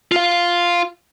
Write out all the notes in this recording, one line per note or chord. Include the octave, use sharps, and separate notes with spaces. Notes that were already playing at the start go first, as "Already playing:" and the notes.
F4 F5